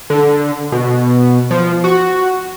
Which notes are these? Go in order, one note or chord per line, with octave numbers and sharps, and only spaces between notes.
D3
B2
F3
F#4